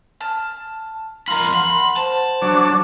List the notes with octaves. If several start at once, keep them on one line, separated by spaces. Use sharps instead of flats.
A5 F6
F2 F4 A#4 B5 C6
F#5 B5
C5 A5
F#3 D4